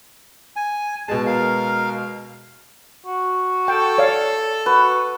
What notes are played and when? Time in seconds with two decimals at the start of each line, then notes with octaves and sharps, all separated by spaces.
0.56 G#5
1.08 B2 G#3 A5
1.27 A#4 F5
3.06 F#4
3.68 A4 G5
3.98 C#5 D5 F5
4.66 F#4 B4